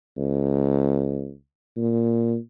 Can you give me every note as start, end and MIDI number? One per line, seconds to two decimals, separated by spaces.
0.17 1.33 37
1.77 2.36 46